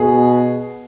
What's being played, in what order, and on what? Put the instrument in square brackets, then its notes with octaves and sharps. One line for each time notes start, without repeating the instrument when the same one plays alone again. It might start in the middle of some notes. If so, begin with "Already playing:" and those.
Already playing: [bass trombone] B2 [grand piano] G#4